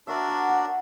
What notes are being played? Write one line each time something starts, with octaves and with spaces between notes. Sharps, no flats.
D4 F#4 A#4 D5 E5
F#5
F#5